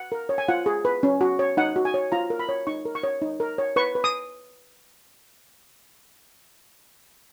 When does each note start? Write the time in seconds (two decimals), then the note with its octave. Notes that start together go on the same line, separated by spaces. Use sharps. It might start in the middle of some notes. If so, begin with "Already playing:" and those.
Already playing: F#5
0.12 A#4
0.29 C#5
0.38 G#5
0.48 F4 F#5
0.66 G#4
0.85 B4
1.03 C#4
1.21 F#4
1.39 C#5
1.57 D#4 F#5
1.76 F#4
1.85 G#5
1.94 C#5
2.12 F4 A#5
2.30 A#4
2.39 B5
2.49 C#5
2.67 D#4 C#6
2.85 A#4
2.95 C#6
3.03 C#5
3.22 D#4
3.40 A#4
3.58 C#5
3.76 B4 C#6
3.95 B4
4.04 D#6